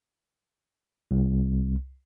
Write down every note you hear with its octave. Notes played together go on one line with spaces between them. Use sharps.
C2